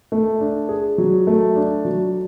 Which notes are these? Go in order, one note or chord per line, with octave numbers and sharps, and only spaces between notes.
A3
D4
G#4
F#3
A3
D4
F#3